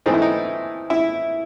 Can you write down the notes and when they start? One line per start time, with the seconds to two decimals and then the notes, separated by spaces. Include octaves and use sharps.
0.06 G#2 E3 A3 C4 D#4
0.14 E4
0.22 D#4
0.90 E4